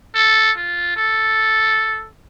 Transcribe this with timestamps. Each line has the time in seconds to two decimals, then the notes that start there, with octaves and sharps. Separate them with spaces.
0.14 A4
0.56 F4
0.96 A4